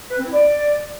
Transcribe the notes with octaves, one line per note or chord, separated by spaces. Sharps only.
B4
C4
E4
D5